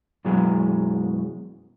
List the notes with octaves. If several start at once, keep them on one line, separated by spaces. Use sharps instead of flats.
F#2 B2 E3 F#3 G#3